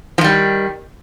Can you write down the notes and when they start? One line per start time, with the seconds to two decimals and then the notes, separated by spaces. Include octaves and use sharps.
0.18 F3
0.21 D#3
0.24 G3